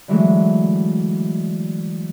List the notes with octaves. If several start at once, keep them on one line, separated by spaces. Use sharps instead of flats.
D3 E3 F#3 G#3 A3